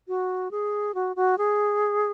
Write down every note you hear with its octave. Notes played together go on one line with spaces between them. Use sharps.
F#4
G#4
F#4
F#4
G#4